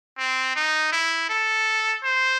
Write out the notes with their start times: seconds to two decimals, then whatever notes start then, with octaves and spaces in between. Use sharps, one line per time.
0.18 C4
0.56 D#4
0.92 E4
1.30 A4
2.04 C5